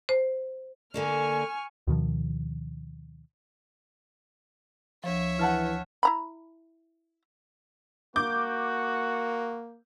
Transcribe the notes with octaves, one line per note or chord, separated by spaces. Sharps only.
C5
D3 A#3 D4 G#5 C#6 F6
D2 B2 D#3 F3
D2 F3 C#5 E5
E3 F#5 A5 F6
E4 A#5 B5
A#3 F#4 D6 G6